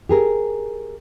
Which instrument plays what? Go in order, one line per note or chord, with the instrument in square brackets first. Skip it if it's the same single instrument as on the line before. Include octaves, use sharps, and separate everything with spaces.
[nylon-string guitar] G4 G#4 A#4